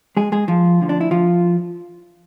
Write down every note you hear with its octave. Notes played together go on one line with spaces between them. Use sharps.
G#3 G#4
G#3 G#4
F3 F4
D2 D3 F3
D4
E4
F3 F4